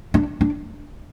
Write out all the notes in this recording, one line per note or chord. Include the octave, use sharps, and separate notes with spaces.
D4
D4